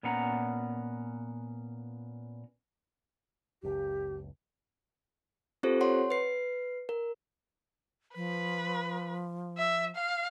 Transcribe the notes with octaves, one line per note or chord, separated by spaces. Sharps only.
A#2 B3 C#4 F#5 A#5
F#1 C#2 G4
C4 F4 G4 A4 C5
C#5 F#5 C6
B4 C7
A#4
F3 B4
E5
F5